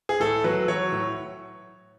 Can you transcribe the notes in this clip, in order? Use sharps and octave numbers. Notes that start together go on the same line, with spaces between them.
G#4
A2 A4
F#3 B4
F#3 C#5
A2